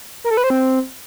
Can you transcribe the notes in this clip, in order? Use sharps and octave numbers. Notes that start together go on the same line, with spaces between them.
A#4
A4
B4
C5
C4